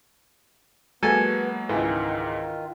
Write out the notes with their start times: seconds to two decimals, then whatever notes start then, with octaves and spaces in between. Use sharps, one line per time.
1.03 F#3 G#3 A#3 B3 A4 G#5
1.69 C#2 G#2 D#3 E3 F4